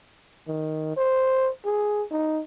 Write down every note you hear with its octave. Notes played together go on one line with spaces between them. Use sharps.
D#3
C5
G#4
D#4